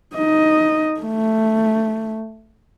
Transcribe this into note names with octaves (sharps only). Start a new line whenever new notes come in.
D#4 D#5
A3